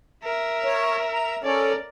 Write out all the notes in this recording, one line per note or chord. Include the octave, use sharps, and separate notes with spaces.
A#4 E5
C#5
A#5
C#4 A4 A#4 C#5 D5